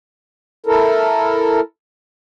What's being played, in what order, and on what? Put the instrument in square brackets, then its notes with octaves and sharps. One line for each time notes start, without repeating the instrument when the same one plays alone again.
[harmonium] E4 A4 A#4